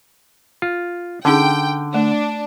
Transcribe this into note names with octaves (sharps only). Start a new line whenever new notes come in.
F4
D3 C#4 D#4 G#4 G5
A3 D4